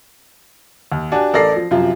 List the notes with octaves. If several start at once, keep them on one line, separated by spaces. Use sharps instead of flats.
D#2
D4 F#4 G4 D5 G#5 A5
A1 A4 A#4 D5 A#6 C7
F3
F#2 C3 F3 F4